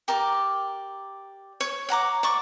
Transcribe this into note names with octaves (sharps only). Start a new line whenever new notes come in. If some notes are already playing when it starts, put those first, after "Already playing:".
G4 A#4 D5
C#5
C#5 F#5 A#5 D6
D5 C#6 D6